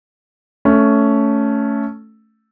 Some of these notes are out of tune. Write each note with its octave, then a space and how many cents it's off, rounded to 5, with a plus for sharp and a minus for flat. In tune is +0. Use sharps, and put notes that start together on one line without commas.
A3 +0 C#4 +10